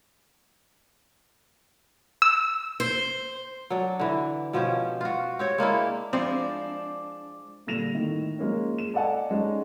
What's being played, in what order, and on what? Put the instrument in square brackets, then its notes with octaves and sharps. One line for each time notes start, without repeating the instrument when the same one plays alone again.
[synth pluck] E6
[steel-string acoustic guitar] C5
[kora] F#3 D4
D3 E3
B2 F3 C#4 G4
F4 F#4
C4 G4 C#5
G#3 A#3 D4 E4
[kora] F3 G#3 E4 [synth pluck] C4 [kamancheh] D4 [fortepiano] D5
[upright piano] A#2 D3 G3 A#6 E7 F7
A2 D#3
F3 G#3 A#3 C#4
E7
A4 D5 D#5 F#5 G#5 A5
G#3 C#4 D#4 G#4